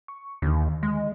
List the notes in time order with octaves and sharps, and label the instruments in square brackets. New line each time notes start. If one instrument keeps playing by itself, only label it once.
[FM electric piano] C#6
[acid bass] D#2 [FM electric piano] D3 D#3
[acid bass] G#3